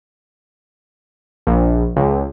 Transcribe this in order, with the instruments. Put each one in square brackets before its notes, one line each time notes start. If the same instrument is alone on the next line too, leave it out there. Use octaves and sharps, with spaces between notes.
[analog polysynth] A#1
C#2